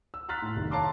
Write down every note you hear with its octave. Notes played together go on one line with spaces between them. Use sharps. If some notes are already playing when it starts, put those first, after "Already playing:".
E6
A#5 C6 F6 F#6 A6 B6
A2
D#1 C3 D#3
C#5 F5 A5 A#5 C6 D6